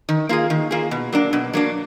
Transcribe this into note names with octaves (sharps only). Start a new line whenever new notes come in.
D#3
A#3 F4 G#4
D#3
A#3 F4 G#4
B2
F#3 A#3 D4
B2
F#3 A#3 D4